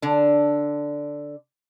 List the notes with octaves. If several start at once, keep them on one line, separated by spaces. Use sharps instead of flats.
D3 D4